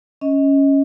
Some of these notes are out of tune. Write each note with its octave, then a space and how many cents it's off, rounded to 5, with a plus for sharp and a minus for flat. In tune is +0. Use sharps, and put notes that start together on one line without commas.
C#4 +0 D#5 +20